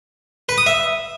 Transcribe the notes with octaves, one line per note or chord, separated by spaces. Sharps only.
B4
D#6
E5